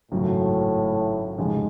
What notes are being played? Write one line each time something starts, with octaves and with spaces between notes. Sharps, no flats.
G#1 F#2 A2 C#3 F#3
F1 F2 G#2 C#3 F3 G#3